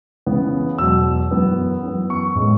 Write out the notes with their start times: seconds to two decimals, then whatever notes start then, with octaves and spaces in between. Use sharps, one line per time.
0.26 C#3 E3 B3
0.78 E2 B2 F#3 E6
1.31 F#2 E3 B3
1.83 F#2 E3 B3
2.10 C#6
2.35 A2 G#3 B3